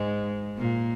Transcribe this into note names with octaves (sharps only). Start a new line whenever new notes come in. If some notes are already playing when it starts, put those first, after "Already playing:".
Already playing: G#2 G#3
A#2 A#3